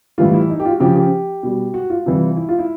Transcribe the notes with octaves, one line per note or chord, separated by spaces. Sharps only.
A2 E3 G3 F4
E4
D#4
G4
F4
F#4
C#3 F3 G4
G4
B2 G3
F#4
F4
C3 E3 G3
E4
F4
E4